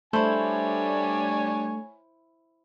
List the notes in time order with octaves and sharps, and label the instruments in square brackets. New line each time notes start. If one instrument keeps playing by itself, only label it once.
[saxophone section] G3 D4 [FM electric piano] A3 [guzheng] E4 C5 [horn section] C#5 G#5